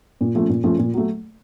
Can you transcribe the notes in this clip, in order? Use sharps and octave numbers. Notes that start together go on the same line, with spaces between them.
A#2
F3 A3 C#4
A#2
F3 A3 C#4
A#2
F#3 A3